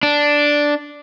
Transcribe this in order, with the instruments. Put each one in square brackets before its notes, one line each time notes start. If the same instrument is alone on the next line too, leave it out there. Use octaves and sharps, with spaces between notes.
[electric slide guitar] D4